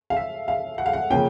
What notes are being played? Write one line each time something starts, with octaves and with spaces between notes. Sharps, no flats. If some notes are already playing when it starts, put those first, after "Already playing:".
F5
E5
F5
F#5
F5
F#5
C#3 F3 A#3 C#4 G5